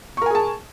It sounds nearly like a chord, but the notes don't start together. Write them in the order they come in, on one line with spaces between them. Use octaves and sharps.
C#6 A#4 G#5 G#4 A5